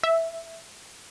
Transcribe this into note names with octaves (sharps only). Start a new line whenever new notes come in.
E5